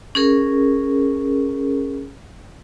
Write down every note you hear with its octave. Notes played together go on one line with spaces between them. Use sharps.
C#4 G#4 A#4